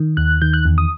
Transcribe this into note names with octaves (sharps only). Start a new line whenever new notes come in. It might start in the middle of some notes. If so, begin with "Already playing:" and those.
Already playing: D#3
D#2 F#6
D#3 G6
F#6
E2
D#6